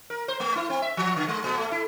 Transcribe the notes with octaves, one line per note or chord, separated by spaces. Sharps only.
A#4
C5
A3
E4
C4
E5
F3
D3
G#3
A#2
A3
E4